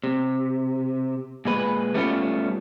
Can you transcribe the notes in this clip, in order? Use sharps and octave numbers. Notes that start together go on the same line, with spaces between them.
C3
A#2 G#3 B4
G3 A3 B3 C#4 E4 F4